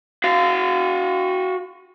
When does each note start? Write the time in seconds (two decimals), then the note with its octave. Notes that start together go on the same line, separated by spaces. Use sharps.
0.24 F#4 F5